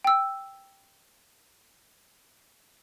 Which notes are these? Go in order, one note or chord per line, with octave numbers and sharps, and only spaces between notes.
G5 E6